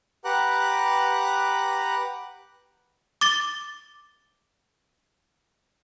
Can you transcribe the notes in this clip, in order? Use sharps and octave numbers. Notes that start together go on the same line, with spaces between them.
G4 B4 F#5 A#5 D6 F#6
D6 A6 G7